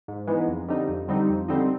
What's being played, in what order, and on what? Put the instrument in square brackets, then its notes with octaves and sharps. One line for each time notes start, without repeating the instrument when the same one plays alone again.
[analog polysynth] G#2
E3 G#3 B3 D#4
F2
D3 G3 C4 D#4
F2
D3 G3 C4 D#4
F2
D3 G3 C4 D#4